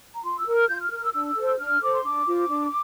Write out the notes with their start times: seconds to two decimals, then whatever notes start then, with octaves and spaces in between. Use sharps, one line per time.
0.15 A#5
0.24 F4 C6
0.38 E6
0.47 A#4
0.54 F6
0.69 F4 G6
0.80 F6
0.90 A#4 F6
1.03 E6
1.13 D4 E6
1.36 A4 C5
1.58 D4 F6
1.81 A4 C5 D6
1.93 C6
2.04 D4 D6
2.26 F4 C5
2.49 D4